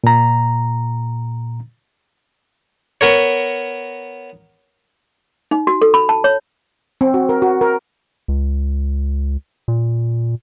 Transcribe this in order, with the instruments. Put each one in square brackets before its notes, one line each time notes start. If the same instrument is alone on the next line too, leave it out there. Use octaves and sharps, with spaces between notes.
[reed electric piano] A#2 A#5
[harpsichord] B3 A#4 C#5
[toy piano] D#4
F#4
A4
B5
A5
C#5
[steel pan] C4
F#4
A#4
F#4
A#4
[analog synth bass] C#2
A#2